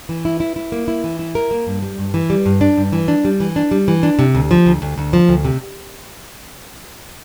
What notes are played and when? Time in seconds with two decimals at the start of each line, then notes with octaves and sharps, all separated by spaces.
0.09 E3
0.25 E4
0.40 E4
0.56 E4
0.72 A#3
0.88 E4
1.04 E3
1.19 E4
1.35 A#4
1.51 A#3
1.67 G2
1.82 G3
1.99 G2
2.14 E3
2.30 G3
2.46 G2
2.61 D4
2.77 G2
2.93 E3
3.08 D4
3.25 G3
3.40 E3
3.56 D4
3.71 G3
3.88 E3
4.03 D4
4.19 C3
4.35 D2
4.51 F3
4.66 D2
4.82 D2
4.98 D2
5.13 F3
5.29 D2
5.44 C3